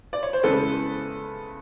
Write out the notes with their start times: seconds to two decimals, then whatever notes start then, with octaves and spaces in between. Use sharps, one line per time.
0.13 D5
0.23 C#5
0.33 C5
0.43 E2 C#3 E3 G#3 A4 B4